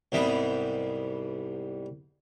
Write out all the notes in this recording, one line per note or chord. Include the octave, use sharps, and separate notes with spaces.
C2 G#2 C3 G3 B3 D#5